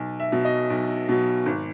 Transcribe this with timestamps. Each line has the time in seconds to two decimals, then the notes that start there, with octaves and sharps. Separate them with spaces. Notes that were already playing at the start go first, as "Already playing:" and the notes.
Already playing: B1
0.20 E5
0.32 B2 F#3
0.45 D#5
0.70 B1
1.08 B2 F#3
1.46 G#1